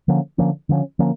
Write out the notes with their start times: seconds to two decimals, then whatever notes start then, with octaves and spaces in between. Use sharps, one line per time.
0.08 D3 F3 A#3 C#4
0.38 D3 F3 A#3 C#4
0.69 D3 F3 A#3 C#4
0.99 D3 F3 A#3 C#4